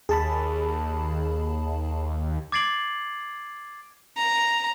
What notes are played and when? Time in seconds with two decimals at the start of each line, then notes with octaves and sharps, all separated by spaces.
0.09 D#2 G#4 A5 B5
2.52 D6 G#6 A6 C7 D7 F#7
4.17 A#5